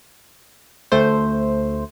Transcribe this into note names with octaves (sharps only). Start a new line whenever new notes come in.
D2 A3 C5